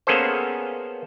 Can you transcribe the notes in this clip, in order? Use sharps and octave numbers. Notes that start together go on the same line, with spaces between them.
A#3 B3 C#4 G#4 A4 C5